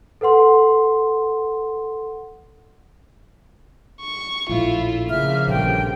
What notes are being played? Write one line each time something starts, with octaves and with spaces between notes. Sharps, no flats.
A4 B4 F#5 C6
C#6
A#1 A2 E4 F4
C#3 F3 A#3 E5 F6
A#1 G2 D3 G5